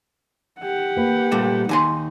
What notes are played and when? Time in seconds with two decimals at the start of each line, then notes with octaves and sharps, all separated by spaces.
0.61 G4 F#5
0.97 A#3 B4
1.32 A#2 G3 A3
1.69 D#2 D#4 G#5 C6